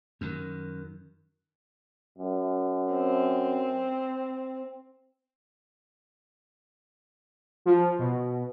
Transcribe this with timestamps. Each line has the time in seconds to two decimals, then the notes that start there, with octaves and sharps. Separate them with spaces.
0.21 F#2 D#3
2.18 F#2
2.94 C4
7.66 F3
7.99 B2